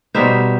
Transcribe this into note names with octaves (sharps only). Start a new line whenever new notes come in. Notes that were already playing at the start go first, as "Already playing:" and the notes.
B2 G3 D#4 C5 E5